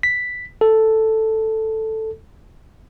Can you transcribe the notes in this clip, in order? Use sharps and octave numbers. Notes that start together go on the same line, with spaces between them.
B6
A4